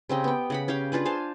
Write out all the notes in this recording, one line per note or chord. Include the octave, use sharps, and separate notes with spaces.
C#3 C4 G4 D#5
B3 G5
C#3 F#5 B5
C#4 G4 F5 G5
D4 F4 G#4 B4
C5 F5 G#5 A5